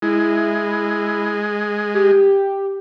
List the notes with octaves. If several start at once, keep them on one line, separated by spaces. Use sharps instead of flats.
G#3 E4
G4